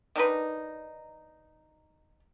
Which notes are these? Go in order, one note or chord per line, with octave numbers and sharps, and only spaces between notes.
D#3 D4 D#4 B4